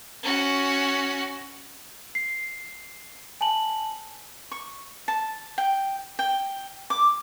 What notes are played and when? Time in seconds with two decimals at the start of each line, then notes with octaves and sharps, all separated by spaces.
0.23 C#4 F#4
2.15 C7
3.41 G#5 A5 F#7
4.52 C#6
5.08 A5
5.58 G5
6.19 G5
6.90 D6